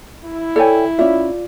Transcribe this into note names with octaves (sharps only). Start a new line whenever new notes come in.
E4
A4 C#5 D5 G5 G#5
C#4 F4 D5 E5